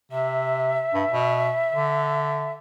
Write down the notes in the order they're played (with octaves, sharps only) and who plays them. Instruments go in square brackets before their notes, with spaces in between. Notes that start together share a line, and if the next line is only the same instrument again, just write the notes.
[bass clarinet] C3 [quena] E5
[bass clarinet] G2
B2
D3